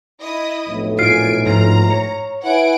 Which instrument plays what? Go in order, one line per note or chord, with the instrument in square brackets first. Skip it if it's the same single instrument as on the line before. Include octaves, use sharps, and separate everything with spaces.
[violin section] E4 D#5 D#6
[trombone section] B1 F2 A2
[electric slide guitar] A#2 F4 [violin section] G#5 D7 [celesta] F6 C7
[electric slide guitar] G#2 F3 [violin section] A#5
[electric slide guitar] C#5
[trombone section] E4 B4 [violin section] F#5 G#5 D7